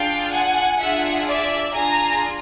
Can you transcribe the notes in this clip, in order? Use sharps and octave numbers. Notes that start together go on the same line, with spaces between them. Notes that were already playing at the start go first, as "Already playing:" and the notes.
Already playing: D4 F4 G#4 F5 G5
F#5 G#5
D4 F4 G#4 E5 F#5
D5 E5
D4 F4 G#4 G#5 A#5